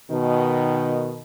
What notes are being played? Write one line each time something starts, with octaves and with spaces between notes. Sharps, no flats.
B2 D#3